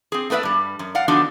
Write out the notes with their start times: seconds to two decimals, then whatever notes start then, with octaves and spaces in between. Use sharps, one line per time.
0.12 C4 G#4
0.30 A3 B3 B4 D5 E5
0.43 G2 G3
0.79 F#2
0.95 D5 F5 F#5
1.08 D3 F3 B3 D4 D#4 F#4